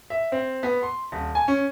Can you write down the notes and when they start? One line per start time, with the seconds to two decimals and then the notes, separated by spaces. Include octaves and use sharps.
0.10 E5
0.32 C4
0.63 B3
0.82 C6
1.12 D#1
1.35 G#5
1.48 C#4